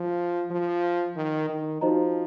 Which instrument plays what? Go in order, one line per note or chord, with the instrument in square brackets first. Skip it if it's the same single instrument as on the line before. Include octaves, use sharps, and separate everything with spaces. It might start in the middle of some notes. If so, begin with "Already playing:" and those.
Already playing: [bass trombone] F3
F3
D#3
D#3
[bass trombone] F3 [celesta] D#4 F#4 C5 D#5 A#5